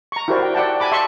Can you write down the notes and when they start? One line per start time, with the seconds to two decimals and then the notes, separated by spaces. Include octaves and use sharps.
0.12 A#5 C#6
0.28 E4 F#4 G4 A#4 C5 D5
0.43 G5
0.55 D5 E5 F#5 G5 A5
0.80 G#5 A5 B5 D6
0.92 E5 A5 C6 C#6